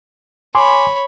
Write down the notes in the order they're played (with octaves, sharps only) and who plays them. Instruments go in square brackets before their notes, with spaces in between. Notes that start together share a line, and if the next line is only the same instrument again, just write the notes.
[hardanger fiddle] C#5 B5 [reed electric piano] G#5 C6 D6